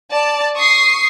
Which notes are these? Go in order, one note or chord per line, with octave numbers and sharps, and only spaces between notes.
D5 A5
C#6 D#6 C7